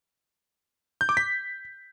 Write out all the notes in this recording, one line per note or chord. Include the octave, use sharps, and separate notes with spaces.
G6
D6
B6